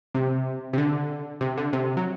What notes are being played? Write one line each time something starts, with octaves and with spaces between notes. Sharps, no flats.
C3
C3
D3
C3
D3
C3
F#3